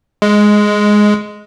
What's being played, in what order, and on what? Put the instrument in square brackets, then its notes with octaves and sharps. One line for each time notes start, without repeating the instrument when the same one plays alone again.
[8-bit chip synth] G#3